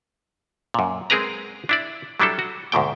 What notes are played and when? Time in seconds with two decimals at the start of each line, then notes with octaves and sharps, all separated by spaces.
0.74 F#2 A#2
1.10 G#3 C4 G#4 A#4 B4 A#5
1.69 D4 E4 D5
2.20 F#3 G3 D4 E4 A4
2.39 F#4
2.72 D2 G#2 B2 G5